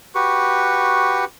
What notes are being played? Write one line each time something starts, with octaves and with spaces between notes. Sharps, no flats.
F#4 G4 B4 C#6